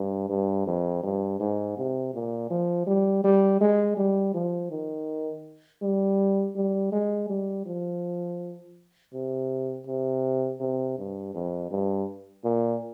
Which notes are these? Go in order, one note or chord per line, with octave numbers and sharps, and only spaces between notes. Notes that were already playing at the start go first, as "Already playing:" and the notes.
Already playing: G2
G2
F2
G2
G#2
C3
A#2
F3
G3
G3
G#3
G3
F3
D#3
G3
G3
G#3
G3
F3
C3
C3
C3
G2
F2
G2
A#2